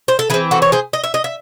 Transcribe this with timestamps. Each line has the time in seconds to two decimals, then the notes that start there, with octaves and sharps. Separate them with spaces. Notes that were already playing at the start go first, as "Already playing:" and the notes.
0.08 C5
0.19 A4
0.30 E3 E4 G#4
0.34 C4
0.51 F#4 A4
0.62 C#5
0.72 G#4 C5
0.93 D#5
1.04 E5
1.14 D#5
1.24 E5